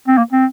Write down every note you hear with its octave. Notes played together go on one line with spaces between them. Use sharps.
C4
A#3
C4